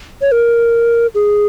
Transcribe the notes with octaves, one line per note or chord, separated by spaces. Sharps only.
C#5
A#4
G#4